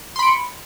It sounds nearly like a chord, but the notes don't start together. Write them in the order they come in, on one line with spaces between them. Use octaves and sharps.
C6 B5 D7 C#7